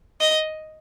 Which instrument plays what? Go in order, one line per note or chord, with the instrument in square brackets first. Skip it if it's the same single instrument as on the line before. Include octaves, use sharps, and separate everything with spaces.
[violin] D#5